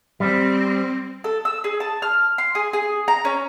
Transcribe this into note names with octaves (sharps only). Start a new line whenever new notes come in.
G3 C4
A4
E6
G#4
A5
F6
C6
G#4
G#4
A#5
C#4